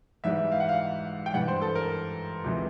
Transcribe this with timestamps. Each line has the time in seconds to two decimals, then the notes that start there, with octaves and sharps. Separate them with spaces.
0.24 G#2 E3 G3 E5
0.52 F5
0.60 F#5
0.69 F5
1.26 G5
1.34 G2 E3 G3 F#5
1.48 C5
1.61 A4
1.75 A#4
2.44 C#2 C3 E3